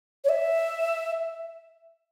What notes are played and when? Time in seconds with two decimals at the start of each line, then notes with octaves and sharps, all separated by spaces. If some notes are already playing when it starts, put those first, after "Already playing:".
0.24 C#5
0.29 E5